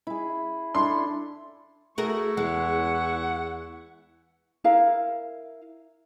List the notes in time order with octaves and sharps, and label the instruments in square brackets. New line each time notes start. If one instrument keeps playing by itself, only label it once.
[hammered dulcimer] E4 G#4
[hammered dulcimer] D4 E4 A4 [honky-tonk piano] C6
[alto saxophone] A3 [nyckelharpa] E4 C#6 [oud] F#4 G#4 A#4
[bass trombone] E2 [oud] G#3 [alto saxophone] F#5
[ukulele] E4 A#4 F5